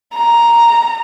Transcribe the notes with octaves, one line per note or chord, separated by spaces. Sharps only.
A#5